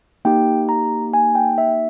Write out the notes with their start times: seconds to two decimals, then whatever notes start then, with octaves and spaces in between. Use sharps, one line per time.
0.25 A#3 D#4 G4 G5
0.69 A#5
1.14 G#5
1.35 G5
1.58 E5